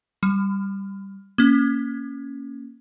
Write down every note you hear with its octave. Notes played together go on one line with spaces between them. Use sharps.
G3
A#3 C#4